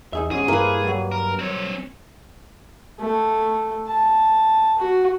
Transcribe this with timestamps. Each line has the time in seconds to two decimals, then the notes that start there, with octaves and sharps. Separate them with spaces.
0.13 E2 D#4 G#4 E5
0.31 E2 G#2 C#4 G#4
0.48 G2 A#3 E4 B4 C5 F5
0.83 F#3 G3
1.12 A#4
1.39 C4 C#5
3.00 A3
3.88 A5
4.79 F#4